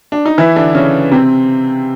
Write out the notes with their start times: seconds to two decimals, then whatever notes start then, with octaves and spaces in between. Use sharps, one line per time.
0.12 D4
0.26 D#4
0.38 E3 E4
0.56 D3 D4
0.75 C#3 C#4
1.11 C3 C4